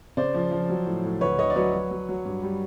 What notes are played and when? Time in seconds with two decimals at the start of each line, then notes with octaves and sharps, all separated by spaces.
0.17 C#3 C5 D5
0.34 F3
0.51 F3
0.69 F#3
0.87 A2
1.04 A2
1.21 D2 B4 C#5
1.38 D2 C#5 D#5
1.50 D5
1.56 F#3 B4 C#5
1.74 F#3
1.91 F#3
2.09 F#3
2.25 G2
2.43 G3